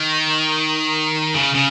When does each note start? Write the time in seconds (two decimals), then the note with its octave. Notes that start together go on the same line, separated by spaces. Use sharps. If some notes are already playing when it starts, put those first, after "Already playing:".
Already playing: D#3
1.35 C#3
1.55 C#3